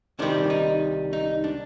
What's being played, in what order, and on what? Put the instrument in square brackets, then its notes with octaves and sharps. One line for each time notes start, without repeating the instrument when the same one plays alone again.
[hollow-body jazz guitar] C2 C3 D#3 G3 D4
D#4
D#4
D4